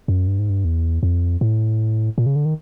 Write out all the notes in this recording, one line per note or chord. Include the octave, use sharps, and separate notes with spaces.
F#2
G2
G#2
G2
E2
F2
A2
A#2
C#3
D3
D#3